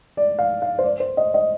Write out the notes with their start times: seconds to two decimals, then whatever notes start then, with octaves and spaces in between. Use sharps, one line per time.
0.17 D5
0.39 F5
0.62 F5
0.79 C5
0.84 D5
1.00 C5
1.17 D#5
1.34 D#5